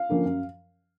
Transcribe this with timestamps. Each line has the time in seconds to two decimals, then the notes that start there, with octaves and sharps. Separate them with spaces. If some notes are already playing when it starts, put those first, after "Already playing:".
Already playing: F5
0.09 D3 F3 A#3 C#4
0.25 F#2